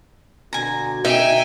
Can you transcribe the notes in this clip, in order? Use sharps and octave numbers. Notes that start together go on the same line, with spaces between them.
B2 D3 F#4 G#5 A#5
B2 D3 D#4 E5 G5 G#5